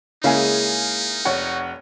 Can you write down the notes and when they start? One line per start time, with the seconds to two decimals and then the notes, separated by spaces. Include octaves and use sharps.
0.24 C#3 G#3 A#3 D#4 E4 F5 G#5
1.25 F1 C#5 F#5